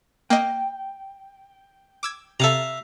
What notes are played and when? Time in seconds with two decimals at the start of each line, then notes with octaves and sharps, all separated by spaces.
0.30 A#3 D#5 G5
2.03 D6 E6 G#6
2.40 C3 A4 E5 F5 A#5